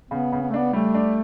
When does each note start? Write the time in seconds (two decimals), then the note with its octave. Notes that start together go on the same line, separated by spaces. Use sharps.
0.11 C#3 B3
0.32 C#3
0.42 B3
0.50 A3
0.54 B3 D4
0.73 G3 A3
0.94 D4